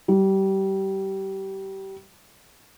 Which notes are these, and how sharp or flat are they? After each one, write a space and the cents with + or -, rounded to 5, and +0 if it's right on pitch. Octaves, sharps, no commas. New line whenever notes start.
G3 -25